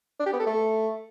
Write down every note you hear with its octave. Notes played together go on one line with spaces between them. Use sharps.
D4
G4
B3
A4
A3